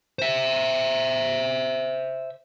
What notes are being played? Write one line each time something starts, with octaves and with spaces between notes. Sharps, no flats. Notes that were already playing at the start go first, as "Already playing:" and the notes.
C5 E5